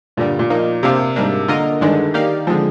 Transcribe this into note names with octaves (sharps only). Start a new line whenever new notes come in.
G2 A#2 D3 G3
A#2
F3 A#3 D#4
C3 A#3 D4 G4 C5 F5
G#2 G3 A#3 D4
D3 A#3 F4 A#4 D#5
G2 D3 D#3 G#3 D4
A#3 D#4 G4 D5 F5
D3 F3 G#3 C4